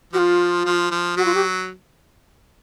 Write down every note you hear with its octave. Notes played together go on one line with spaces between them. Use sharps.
F3 F4 F#4
F3
F3
F#3 F#4
F4
G4